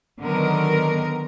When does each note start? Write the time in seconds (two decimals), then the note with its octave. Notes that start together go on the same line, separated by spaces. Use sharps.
0.18 D3 D#3 F#3 B3 A#4